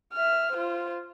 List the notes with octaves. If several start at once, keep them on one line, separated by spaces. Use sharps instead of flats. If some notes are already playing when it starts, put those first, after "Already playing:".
E5 F6
F4 C5